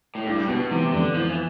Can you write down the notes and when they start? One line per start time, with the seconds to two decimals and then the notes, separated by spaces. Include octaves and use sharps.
0.15 A2
0.27 G2 E4
0.48 B2 B3
0.71 C3 E3
0.93 F2 D3
1.14 F3 E4
1.29 E3